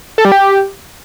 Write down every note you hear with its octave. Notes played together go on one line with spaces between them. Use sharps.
A4
G3
G4